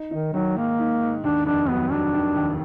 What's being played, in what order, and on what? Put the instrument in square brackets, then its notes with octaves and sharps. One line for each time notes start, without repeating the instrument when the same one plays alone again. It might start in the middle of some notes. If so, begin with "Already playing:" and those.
Already playing: [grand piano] D#4
[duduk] D#3 [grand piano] D#4
[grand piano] D#3 [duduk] F#3
[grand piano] G#2 [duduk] A#3
[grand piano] G#2
G#2
[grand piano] D#2 [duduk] D4
[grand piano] F1 [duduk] D4
[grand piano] F#3 [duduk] B3
[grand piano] F#3 [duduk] D4
[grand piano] D#3
D#2